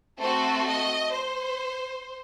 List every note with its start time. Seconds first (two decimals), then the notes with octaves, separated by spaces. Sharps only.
0.19 A3 C4 F#4 A4 C5
0.67 D#5
1.14 C5